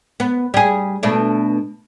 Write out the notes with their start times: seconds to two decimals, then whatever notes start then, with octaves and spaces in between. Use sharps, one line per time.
0.20 B3
0.54 G3 G#4
1.03 B2 A3 D4